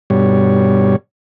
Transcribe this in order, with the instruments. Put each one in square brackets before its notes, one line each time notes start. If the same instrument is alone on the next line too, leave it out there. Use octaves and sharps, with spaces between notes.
[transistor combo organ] G2 B2 G3 C#5